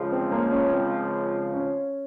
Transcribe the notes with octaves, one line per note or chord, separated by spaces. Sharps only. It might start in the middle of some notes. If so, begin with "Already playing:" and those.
Already playing: C#2 C#3 F3 G#3
C4
A#3
C#4
C4
C#4